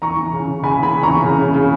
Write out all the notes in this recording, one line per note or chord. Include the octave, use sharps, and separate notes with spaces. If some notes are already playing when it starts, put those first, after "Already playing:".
E3 A#5 C#6
E3
C#3
C#3
C#3 G#5 B5
E3 G#5 B5
C#3
A#5 C#6
E3
C#3
C#3
C#3